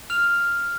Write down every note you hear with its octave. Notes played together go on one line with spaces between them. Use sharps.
F6 F7